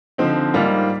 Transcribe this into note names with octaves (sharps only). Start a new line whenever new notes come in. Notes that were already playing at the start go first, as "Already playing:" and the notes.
D3 F3 C4 D#4
G#2 G3 A#3 F4